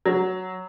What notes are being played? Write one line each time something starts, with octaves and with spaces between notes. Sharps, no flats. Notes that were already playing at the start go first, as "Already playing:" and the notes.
F#3